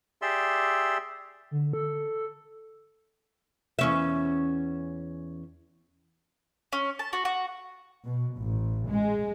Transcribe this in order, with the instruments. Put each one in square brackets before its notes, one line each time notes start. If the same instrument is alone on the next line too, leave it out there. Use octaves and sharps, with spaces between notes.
[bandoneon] G4 G#4 D5 E5 C6 E6
[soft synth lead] D3
A4
[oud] E2 C#4 E5
[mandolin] C#4
A5
F#4
F#4
[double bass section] B2
A1
G#3